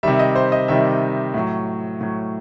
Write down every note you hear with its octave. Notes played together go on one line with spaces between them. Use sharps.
C3 D#3 G3 E5
D#5
C5
D#5
C3 D#3 G3 E5
A2 F#3
A2 F#3